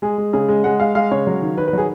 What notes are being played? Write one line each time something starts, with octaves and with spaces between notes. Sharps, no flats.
G#3 G#4
G#3
C#3 G#4
G#3
G#3 F#5
G#3 F5
G#3 F5
C#3 C#5
F#3
D#3
D#3 B4
B4
F#3 G#4